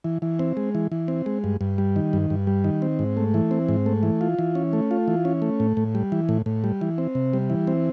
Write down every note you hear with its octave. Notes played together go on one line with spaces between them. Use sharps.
E3
E3
C4
G#3
E3
E3
C4
G#3
G2
G2
G3
D#3
G2
G2
G3
D#3
C4
G#2
A3
E3
C4
G#2
A3
E3
F4
E3
C#4
A3
F4
E3
C#4
A3
A2
A2
G3
E3
A2
A2
G3
E3
C4
C3
G3
E3
C4